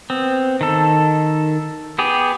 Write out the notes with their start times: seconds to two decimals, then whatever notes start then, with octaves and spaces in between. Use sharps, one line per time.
0.10 B3 C4
0.61 D#3 A4
1.99 B3 G4 G#4